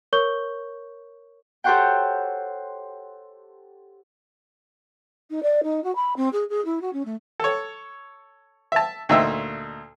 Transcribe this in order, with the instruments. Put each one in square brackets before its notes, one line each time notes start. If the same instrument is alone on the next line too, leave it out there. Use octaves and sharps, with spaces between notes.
[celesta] A#4 C#5 C#6 G6 G7
[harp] G4 A4 C5 C#5 F#5 G5
[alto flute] D#4
D5
D#4
F#4
B5
C4
G#4
G#4
E4
F#4
C#4
A3
[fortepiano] A4 C#5
E5 A5
D2 A#2 D#4 E5 E6